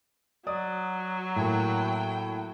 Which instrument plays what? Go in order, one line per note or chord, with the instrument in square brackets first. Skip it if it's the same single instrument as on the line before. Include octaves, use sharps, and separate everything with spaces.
[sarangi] F#3 [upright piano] D5 D#6
[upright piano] A2 A#3 [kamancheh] G5